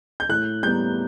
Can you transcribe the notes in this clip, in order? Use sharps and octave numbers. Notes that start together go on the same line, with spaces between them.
G6
A2 F#6
G3 B3 G6